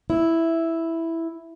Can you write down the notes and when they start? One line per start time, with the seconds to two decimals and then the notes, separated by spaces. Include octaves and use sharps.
0.10 E4